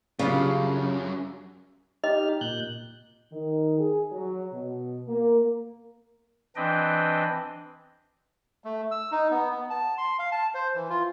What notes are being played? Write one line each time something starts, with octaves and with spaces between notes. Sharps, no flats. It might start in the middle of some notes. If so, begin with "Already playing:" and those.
F#2 C#3 G3 D4 F4
D#4 G4 D#5 F6
A#2 F#6 G6
D#3
G#4
F#3
B2
A#3
E3 C4 D4 B4 D#5 G5
A3
E6
D#4
B3
B3
A5
C6
F5
A5
C5
E3
F4